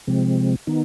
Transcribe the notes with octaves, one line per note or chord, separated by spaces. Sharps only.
C3 F3 G#3 C4
D#3 B3 D#4